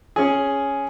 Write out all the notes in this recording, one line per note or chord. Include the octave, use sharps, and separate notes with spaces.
C#4 G#4